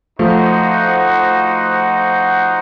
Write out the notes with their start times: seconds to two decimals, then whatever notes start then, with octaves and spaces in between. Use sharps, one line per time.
0.19 F3 A3 D#4 F#4 C5 F#5